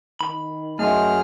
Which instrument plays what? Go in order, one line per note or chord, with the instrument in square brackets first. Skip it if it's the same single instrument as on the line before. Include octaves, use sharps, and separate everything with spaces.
[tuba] D#3 [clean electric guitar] B5
[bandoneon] F#2 G#4 F6 [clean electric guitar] A3 [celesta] D#5 E5 C6